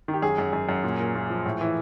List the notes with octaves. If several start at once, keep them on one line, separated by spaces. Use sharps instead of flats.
D#3
G4
F#2 G#4
F#2
F#2
F#2
A#2
A#2
A#2
F3
A2
E3